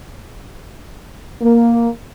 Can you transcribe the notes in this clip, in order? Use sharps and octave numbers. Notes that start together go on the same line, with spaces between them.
A#3